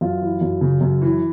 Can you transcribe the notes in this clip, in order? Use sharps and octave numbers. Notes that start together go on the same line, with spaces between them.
F#2 F4
E3
F#2
C#3
F#2
E3